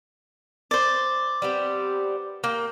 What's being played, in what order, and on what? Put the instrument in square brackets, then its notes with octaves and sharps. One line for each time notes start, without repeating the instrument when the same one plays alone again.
[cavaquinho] C5 D5
[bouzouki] G3 B3 C4
A#3 G5